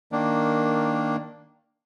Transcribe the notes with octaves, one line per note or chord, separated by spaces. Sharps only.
D#3 A#3 D4